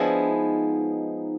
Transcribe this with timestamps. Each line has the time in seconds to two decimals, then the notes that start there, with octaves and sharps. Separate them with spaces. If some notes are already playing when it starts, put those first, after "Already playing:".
Already playing: F3 G#3 B3 D4 E4
0.29 D#4